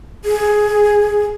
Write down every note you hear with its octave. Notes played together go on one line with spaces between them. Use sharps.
G#4